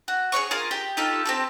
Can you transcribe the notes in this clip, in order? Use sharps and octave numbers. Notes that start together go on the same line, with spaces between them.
F#4
G#4 B4 C#5 C#6
F4 G#4 A#4 F5
G4 G5
D#4 F4 G4 A4
C4 G4 A4